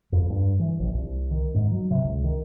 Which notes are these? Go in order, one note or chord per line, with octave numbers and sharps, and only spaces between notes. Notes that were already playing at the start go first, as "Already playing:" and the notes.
F2
G2
E3
A#1
C2
D#3
G#2
F#3
C3
C#2
D#3